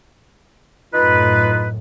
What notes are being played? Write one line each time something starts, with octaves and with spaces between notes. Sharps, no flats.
F#2 A2 D#4 F4 B4